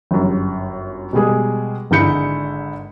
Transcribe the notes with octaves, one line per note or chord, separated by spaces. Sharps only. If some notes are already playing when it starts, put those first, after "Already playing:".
G1 F#2
B2 G3 G#3 G#4
G#1 D3 G#3 E4 G6 C#7